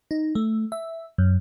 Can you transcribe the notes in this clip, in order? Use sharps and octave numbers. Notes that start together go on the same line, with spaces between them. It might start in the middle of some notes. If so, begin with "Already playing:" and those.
D#4
A3
E5
F#2